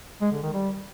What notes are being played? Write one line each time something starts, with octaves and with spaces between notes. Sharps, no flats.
G#3
D3
D#3
G3